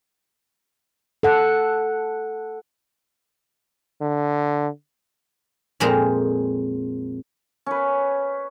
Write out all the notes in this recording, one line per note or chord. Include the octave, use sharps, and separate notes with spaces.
A4 F#5
D3
F2 A#2 G#3 C5 A#5
C#4 B4